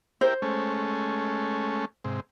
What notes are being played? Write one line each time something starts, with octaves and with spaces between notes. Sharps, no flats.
E4 G4 A#4 C5
G#3 A3 C#4
G#2 C3